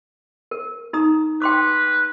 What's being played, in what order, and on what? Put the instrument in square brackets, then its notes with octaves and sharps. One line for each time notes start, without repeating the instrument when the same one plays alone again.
[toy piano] A#4
D#4 A#5 D#6
[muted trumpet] B4 [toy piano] G5 C6 D6